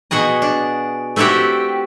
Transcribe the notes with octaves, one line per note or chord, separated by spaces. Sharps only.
B2 F#4 G#4 D#5
D4
A3 C4 E4 F#4 G4